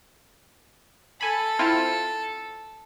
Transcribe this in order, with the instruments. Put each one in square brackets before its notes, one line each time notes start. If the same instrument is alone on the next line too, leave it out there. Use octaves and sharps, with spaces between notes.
[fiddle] A4 [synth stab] G#5 B5
[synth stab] C4 E4 F4